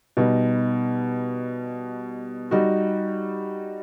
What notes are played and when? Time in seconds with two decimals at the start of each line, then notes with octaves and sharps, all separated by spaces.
0.17 B2 G3 D#4
2.51 G3 D#4 F#4